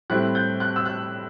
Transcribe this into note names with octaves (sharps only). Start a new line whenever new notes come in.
A2 G3 C4 E4 F#6
G6
F#6
E6
F#6